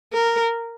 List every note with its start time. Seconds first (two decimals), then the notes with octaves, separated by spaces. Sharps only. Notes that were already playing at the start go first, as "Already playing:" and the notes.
0.13 A#4